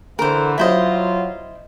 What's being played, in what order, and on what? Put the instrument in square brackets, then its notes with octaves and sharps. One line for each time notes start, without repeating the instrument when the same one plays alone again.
[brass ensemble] D3 E3 [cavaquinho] A#4 C5
[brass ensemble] F#3 F4 [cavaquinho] E4 C5 D#5